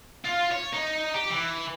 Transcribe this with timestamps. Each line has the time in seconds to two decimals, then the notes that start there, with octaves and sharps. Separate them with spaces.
0.25 F4
0.51 C#5
0.73 D#4
1.14 G4
1.29 E3